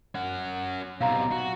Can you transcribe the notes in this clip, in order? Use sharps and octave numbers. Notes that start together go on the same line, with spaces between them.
C#4 F#5
B1 C3 F5 A#5
F#4